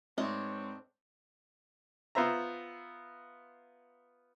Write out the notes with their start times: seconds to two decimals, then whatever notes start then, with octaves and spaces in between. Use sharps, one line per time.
0.18 G#2 G3 A3 B3 C4 D4 C#5 D#5
2.15 B3 F4 C5 E5 A#5